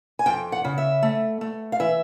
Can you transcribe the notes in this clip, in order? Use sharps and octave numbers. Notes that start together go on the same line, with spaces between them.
G#5
F2 G5
F#5
C#3
E5
A3
A3
F5
E3 E5